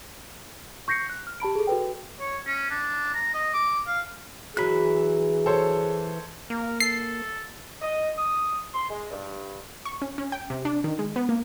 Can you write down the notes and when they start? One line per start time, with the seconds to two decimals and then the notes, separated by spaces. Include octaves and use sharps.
0.88 C#6 G6 A#6 C7 C#7
1.09 F#6
1.27 F6
1.40 G4 A5 B5 D7
1.55 G#4 A4
1.67 F#4 A4 B4 G5
2.20 C#5
2.47 C#4
2.70 D4
3.14 A#5
3.34 D#5
3.54 D6
3.87 F5
4.57 E3 F#3 G#4 B5 F#6
5.46 A4 C5 C#5
6.50 A#3 A#4
6.80 A4 C7
7.82 D#5
8.17 D#6
8.74 C6
8.91 G#3
9.11 G2
9.85 C#6
10.02 C#4
10.18 C#4
10.32 G5
10.50 C3
10.65 D4
10.84 D#3
10.99 G#3
11.16 B3
11.29 A#3